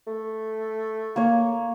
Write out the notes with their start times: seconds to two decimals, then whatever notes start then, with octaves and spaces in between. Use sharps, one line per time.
0.07 A3
1.16 A#3 C#5